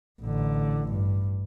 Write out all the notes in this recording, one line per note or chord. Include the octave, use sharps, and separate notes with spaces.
A1 D3
G2